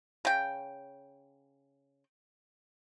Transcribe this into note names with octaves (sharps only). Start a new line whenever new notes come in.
C#3 G5